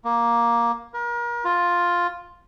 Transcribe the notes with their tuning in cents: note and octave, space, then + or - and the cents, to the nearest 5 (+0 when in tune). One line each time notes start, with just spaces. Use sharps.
A#3 +10
A#4 +35
F4 +5